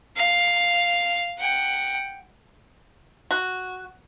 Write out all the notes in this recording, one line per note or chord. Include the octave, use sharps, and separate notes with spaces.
F5
F#5 G5
F#4